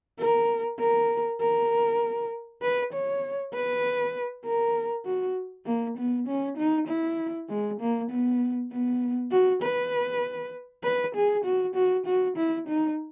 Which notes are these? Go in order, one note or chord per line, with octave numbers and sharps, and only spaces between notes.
A#4
A#4
A#4
B4
C#5
B4
A#4
F#4
A#3
B3
C#4
D#4
E4
G#3
A#3
B3
B3
F#4
B4
B4
G#4
F#4
F#4
F#4
E4
D#4